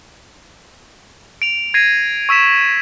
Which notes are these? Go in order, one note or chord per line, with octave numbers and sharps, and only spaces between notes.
D7 F7
G#6 A#6 C7 D#7
C#6 E6 B6 E7